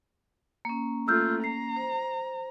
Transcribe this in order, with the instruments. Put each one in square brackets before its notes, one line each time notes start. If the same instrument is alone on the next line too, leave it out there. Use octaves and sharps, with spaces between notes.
[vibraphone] A#3 C#4
[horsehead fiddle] A3 F4 [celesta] E6 F6 G6
[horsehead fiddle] A#5 [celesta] C7
[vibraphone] C5